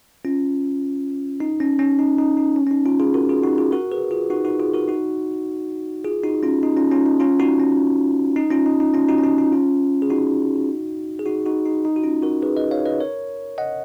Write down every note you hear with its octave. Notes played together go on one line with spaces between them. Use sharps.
C#4 F4
D#4
C#4
C#4
D#4
D#4
D#4
C#4
C#4
D#4
C#4 F4
F4 G#4
F#4 A#4
F4 G#4
D#4 F#4
F4 G#4
F#4 A#4
G#4 B4
F4 G#4
D#4 F#4
D#4 F#4
F4 G#4
F#4 A#4
D#4 F#4
F4 G#4
D#4 F#4
C#4 F4
D#4
C#4 F4
C#4 F4
D#4
C#4 F4
D#4 F#4
C#4
D#4
C#4 F4
D#4
D#4
C#4 F4
D#4 F#4
C#4
D#4
D#4
C#4 F4
G#4
D#4 F#4
G#4
D#4 F#4
D#4 F#4
D#4
D#4
F#4
C#4 F4
F#4 A#4
G#4 B4
B4 D#5
C#5 F5
B4 D#5
A#4 C#5
D#5 F#5